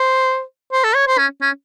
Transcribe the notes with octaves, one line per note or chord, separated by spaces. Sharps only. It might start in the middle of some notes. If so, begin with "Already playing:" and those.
Already playing: C5
C5
A4
C#5
C5
C#4
C#4